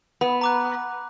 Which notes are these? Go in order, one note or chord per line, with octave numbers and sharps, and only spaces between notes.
B3 B5
A#5 D6 F#6